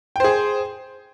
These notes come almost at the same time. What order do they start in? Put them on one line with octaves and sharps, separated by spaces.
G5 C5 G#4